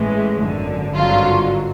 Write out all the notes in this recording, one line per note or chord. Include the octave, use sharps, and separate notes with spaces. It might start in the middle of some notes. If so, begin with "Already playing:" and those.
Already playing: A1 A2 E3 G#3
G#1 F#2 D3
G#1 G2 D3 F#3 F4